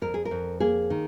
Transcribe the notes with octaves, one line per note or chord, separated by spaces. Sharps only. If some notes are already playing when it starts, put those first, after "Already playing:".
F2 A#4
G#4
A#4
F2
A#3 G#4
D#3